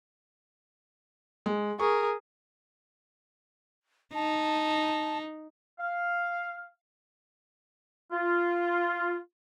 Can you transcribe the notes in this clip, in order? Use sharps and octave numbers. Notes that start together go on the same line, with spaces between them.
G#3
G#4 A#4 C#6
D#4 A5
F5
F4